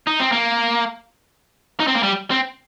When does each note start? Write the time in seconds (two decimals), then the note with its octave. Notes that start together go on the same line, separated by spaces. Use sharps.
0.07 D#4
0.20 C4
0.32 A#3
1.80 D#4
1.87 C4
1.95 A#3
2.03 G3
2.31 C4